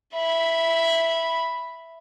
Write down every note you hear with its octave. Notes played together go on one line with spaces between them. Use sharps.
E5 B5